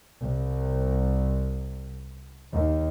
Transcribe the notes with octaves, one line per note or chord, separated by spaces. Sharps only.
C2
D#2